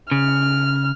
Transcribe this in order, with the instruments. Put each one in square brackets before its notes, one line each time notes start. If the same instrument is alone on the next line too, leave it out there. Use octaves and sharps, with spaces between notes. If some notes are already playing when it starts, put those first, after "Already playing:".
[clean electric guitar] C#3 [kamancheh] F6